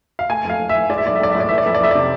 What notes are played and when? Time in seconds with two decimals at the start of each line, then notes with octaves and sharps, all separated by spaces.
0.19 F5
0.29 A3 G#5
0.45 F2 F5
0.59 F2
0.69 E5
0.75 E3
0.89 G#3 D5
0.98 E5
1.05 B1 D5
1.15 E5
1.19 B1 D5
1.32 E5
1.35 A2
1.40 D5
1.49 E3 E5
1.58 D5
1.66 F2 E5
1.74 D5
1.80 F2 E5
1.91 C3 D5